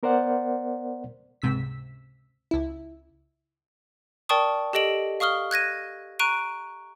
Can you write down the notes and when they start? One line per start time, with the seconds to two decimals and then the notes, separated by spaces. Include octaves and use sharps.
0.03 B3 A#4 C5 D5 F#5
1.42 C#2 G#2 C3 E6 B6
2.51 C#2 E4
4.29 A#4 D5 G5 A5 C#6 D#6
4.73 G4 A4 D#5 D7 F#7
5.20 F5 C#6 D#6 F6 G7
5.51 F#6 G#6 A#6 D#7
6.19 A#5 C#6 F#6 D7 D#7